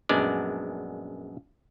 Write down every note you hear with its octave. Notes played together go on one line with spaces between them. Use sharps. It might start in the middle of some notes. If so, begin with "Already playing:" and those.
A#1 F#2 G#3 B3 D4 D5